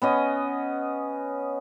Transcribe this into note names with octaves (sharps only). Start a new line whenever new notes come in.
B3 C#4 D#5